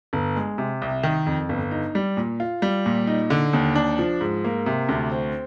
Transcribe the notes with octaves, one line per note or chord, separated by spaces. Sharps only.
G1
G#3
C3
C2
D#3
F2
G1
D#4
G3
A#2
F4
G3
A#2
D#4
D3
D#2
D4
F3
G#2
A#3
C3
D2
C4